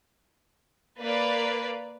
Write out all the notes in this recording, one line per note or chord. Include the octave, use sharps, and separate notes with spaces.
A#3 B4 D5